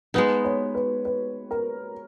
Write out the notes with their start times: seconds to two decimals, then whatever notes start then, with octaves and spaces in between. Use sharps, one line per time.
0.14 G#3 B3 D#4 B4
0.44 C#5
0.75 B4
1.05 B4
1.51 A#4